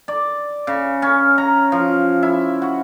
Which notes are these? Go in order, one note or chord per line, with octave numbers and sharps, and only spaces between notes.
D5
C#3
C#4
A#5
F3
E4
F#4